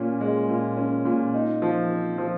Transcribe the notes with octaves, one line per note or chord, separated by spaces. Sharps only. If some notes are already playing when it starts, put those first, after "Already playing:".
Already playing: A#2 C#4
G#3
A#2
C#4
A#2
D#4
F3
C4
F3